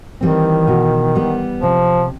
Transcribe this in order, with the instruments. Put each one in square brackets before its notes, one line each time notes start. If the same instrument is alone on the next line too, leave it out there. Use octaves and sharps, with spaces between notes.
[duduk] D#3 [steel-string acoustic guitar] E3 G3 C4
[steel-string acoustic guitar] B2
G3 B3
[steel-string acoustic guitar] C3 [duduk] F3